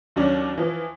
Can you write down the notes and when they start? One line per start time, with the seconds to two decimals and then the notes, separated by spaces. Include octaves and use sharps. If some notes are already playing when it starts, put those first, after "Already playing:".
0.16 D#2 F#3 C#4 D4
0.58 E3 F3